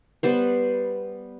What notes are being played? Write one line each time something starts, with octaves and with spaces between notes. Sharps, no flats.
G3 B3 C5